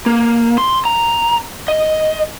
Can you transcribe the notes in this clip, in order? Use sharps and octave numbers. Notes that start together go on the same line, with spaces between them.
A#3
C6
A#5
D#5